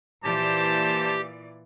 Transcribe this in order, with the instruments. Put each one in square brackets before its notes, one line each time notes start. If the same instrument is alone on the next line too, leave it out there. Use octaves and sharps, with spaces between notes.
[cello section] A#2 E3 D5 [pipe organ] G4 [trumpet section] C5 A5